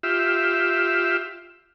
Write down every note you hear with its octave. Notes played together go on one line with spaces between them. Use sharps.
F4 G4 E5